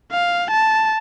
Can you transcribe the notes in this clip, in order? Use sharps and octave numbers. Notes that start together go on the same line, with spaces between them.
F5
A5